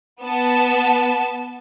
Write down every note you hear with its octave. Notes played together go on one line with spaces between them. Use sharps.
B3 A5